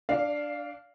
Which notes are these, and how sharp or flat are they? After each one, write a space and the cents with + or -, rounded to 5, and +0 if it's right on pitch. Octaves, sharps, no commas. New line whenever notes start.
D4 +0 D5 -35 F5 +0